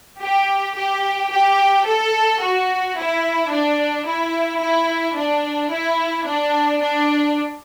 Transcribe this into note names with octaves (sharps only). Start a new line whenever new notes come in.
G4
G4
G4
A4
F#4
E4
D4
E4
E4
D4
E4
D4
D4